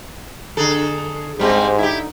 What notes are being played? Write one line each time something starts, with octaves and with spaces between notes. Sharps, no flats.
D3 G#4 A4
G#2 G3 G#3 C4 D#4 G4 C5
D3 D#4 E4 G4